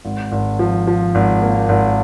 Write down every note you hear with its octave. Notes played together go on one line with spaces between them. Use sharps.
G#1
G#1
F3
F3
G#1
A#3
G#1